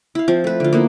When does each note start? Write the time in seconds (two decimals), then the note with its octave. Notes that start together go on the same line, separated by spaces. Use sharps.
0.15 E4 F5
0.28 F3 C4
0.44 A3 B4
0.60 D3 F4
0.73 A#3 B3 E4